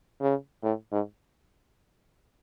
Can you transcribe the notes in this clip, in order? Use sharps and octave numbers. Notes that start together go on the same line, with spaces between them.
C#3
A2
G#2